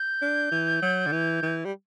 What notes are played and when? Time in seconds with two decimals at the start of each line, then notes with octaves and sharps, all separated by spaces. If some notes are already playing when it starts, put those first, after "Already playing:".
Already playing: G6
0.22 D4
0.51 E3
0.82 F#3
1.06 D3
1.12 E3
1.43 E3
1.65 G3